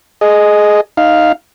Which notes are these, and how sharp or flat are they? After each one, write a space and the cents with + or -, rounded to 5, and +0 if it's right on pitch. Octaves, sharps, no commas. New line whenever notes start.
G#4 +15 D#5 -5
D#4 +0 F5 +0